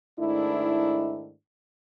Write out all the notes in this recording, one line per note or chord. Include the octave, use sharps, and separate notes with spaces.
G#2 D#3 A3 D4 E4